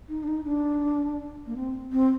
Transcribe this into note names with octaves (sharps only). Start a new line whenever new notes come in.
D#4
D4
D#4
D4
A#3
C4
C4